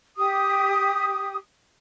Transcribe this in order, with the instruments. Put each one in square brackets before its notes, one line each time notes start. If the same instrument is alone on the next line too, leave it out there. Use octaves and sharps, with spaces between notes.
[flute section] G4 D#6